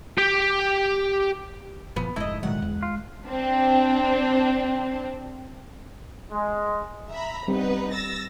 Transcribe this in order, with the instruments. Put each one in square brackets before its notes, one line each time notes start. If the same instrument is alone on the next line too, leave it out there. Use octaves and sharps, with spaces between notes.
[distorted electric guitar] G4 G5
[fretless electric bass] F#1 A#2 F3 [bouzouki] B3
[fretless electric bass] F1 [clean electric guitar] D2 G#2 A3 [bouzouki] E4 D#5
[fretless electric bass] A#2 D#3 F#3 [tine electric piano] G#3 [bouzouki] F#5
[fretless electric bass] E2
[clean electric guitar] F4
[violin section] C4 D4
[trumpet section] G#3
[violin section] E5 A#5 B5
[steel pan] G3 C4 [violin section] B3 D#4 B4
[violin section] E6 A6 A#6